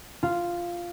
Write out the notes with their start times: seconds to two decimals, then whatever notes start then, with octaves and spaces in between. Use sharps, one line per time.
0.23 F4